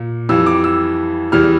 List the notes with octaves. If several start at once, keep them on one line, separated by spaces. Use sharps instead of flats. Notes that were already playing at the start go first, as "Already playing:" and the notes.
Already playing: A#2
F2 E3 G3 E6
D6
E6
E2 E3 G3 F6